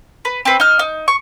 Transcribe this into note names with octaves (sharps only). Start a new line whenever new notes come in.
B4
C4 B4
D#4 F6
D#4
C#6